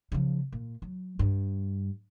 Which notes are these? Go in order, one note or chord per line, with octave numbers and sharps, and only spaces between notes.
C#3 F3
A#2
F#3
G2